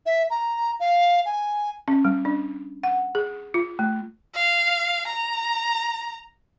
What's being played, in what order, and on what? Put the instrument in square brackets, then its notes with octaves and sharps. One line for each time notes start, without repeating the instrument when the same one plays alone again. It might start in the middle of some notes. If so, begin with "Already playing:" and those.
[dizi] E5
A#5
F5
G#5
[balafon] C#4
G3
D4
F#5
G#4
F4
A3
[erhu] F5
A#5